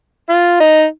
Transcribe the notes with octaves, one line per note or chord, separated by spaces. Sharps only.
F4
D#4